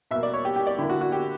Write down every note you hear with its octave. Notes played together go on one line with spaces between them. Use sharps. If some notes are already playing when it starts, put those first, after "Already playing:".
B2 A#3 E5
D5
C#5
G4
G4
D5
D3 A#3 E4
F#4
F#4
G4